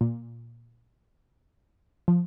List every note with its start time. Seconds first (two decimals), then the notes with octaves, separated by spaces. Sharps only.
0.01 A#2
2.08 F3